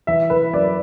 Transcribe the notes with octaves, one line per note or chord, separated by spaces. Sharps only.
E3 E5
E3 B4
F#2 D5